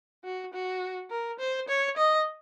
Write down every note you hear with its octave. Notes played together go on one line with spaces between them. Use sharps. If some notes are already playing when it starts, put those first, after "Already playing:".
F#4
F#4
A#4
C5
C#5
D#5